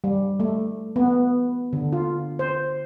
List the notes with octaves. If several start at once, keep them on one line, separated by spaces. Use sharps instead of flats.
G3
A3
B3
D3
F4
C5